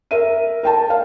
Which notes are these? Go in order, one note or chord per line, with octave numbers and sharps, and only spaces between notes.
A#4 E5 D#7
A#4 G5 A5
F5